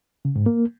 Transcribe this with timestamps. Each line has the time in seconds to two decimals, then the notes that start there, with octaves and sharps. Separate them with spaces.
0.25 C#3
0.36 G#2
0.46 A#3